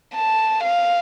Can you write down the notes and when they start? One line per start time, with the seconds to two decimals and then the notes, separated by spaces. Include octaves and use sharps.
0.15 A5
0.63 F5